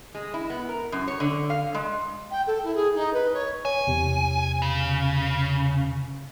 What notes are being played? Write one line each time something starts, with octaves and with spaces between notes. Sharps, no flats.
G#3
E4
B3
A#4
F#2
C#5
D3
F5
G#3
G5
A4
E4
G#4
D#4
B4
C#5
C#5 G#5
E2 C3
C#3